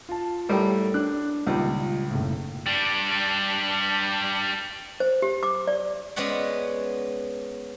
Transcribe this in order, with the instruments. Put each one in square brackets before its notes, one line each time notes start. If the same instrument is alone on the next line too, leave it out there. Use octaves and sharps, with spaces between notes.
[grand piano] F4 A5
[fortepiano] A2 G3 A#4 [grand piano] G4 A4 C#5
[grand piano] D4 [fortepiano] F#6
[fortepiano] C#2 D#3 G3 [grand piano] A#2
[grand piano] F#1 A2
[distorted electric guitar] G3 D4
[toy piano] C5
G4
D6
D5
[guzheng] G#3 B3 C#4 D5 F#5